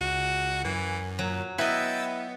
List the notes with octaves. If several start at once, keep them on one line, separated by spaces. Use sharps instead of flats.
C#2 F#4
F#2 E3
A#2 F#3
B3 E4 B4 D#5 G5 E6 A6